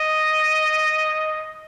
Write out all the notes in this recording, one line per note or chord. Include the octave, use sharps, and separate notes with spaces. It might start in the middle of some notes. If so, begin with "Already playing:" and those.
Already playing: D#5